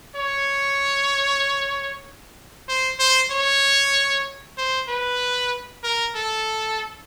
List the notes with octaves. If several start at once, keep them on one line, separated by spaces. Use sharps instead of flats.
C#5
C5
C5
C#5
C5
B4
A#4
A4